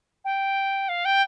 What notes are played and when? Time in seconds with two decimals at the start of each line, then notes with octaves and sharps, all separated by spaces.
0.24 G5
0.88 F5
1.05 G5